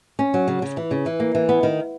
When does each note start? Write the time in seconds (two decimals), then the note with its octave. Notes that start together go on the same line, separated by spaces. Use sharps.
0.19 C#4
0.34 F#3
0.48 C#3
0.62 C#3
0.77 E3
0.91 C#3
1.06 E3
1.20 A#3
1.35 E3
1.49 B3
1.63 D#3